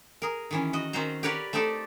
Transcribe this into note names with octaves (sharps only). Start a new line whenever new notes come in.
G#4 A#4
D#3 E3 C#4
F#4 D#5
D#3 C4 C#4 F#4 C5 A#5
G4 A#4 B4 C#5 D5 F#5
A3 C4 D#4 G4 A4 D5